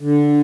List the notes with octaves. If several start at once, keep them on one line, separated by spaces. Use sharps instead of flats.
D3